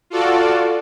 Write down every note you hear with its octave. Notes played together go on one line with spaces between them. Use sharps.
F4 F#4 A4 D5